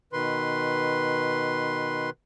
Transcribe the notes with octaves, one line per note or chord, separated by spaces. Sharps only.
B2 D#3 B4 C6